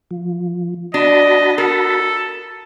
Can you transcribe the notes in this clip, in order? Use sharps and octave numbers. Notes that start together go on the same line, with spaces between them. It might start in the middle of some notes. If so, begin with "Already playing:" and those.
F3
D4 F#4 D#5 A5 B5
A4 A#4